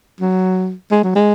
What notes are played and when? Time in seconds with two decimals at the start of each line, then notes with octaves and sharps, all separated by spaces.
0.21 F#3
0.91 G#3
1.04 F#3
1.16 G#3